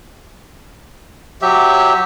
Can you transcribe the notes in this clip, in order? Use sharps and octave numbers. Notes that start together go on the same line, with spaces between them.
F#3 G4 E5